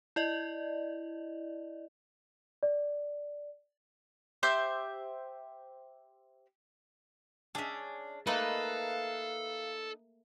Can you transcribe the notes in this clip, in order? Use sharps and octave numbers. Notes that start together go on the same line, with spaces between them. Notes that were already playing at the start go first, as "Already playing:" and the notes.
E4 D5 D#5
D5
G4 C5 E5 G6
C#4 D4 G#4 E5
A3 A#3 D#4 A4 B4 D#5 F5